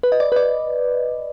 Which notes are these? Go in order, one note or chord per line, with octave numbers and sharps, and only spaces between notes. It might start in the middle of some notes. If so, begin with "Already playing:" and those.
B4
D#5
D5
B4
D5